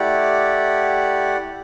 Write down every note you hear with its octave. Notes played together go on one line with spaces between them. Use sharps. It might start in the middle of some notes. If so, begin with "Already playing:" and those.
Already playing: A3 E4 G4 D5 F#5